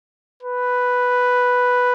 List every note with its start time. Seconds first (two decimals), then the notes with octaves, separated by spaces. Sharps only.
0.43 B4